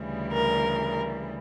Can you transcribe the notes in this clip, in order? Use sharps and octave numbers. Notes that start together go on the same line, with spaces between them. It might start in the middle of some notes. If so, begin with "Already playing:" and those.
Already playing: D2 C#3 E3 G3
A#4